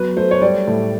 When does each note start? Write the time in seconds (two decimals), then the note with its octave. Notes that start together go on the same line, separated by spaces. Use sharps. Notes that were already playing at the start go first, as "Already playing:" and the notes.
Already playing: F#3 B3 B4
0.17 A3 C5
0.31 C#5
0.42 G3 D5
0.67 A2